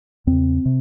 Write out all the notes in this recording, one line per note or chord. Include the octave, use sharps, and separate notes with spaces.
E2 C#3 C4
C3